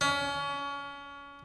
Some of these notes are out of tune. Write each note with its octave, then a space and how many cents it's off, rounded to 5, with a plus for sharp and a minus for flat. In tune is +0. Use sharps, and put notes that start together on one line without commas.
C#4 +30